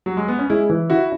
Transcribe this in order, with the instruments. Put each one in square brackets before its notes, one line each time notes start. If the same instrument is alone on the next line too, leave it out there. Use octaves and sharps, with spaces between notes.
[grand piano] F#3
G#3
B3
C#4
[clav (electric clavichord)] G#3 [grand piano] E4
[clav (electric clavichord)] E3
[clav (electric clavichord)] E4 [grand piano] F#4